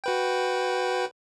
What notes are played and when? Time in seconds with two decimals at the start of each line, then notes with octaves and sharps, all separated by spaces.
0.04 F#4 B4 G5